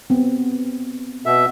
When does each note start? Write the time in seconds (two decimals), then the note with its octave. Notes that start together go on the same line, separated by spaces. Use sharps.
0.10 B3 C4
1.26 B2 E5